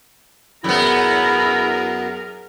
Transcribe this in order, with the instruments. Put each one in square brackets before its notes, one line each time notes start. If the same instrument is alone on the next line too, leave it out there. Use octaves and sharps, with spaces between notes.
[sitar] F#2 B3 [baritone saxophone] E4 [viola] G#4 A#4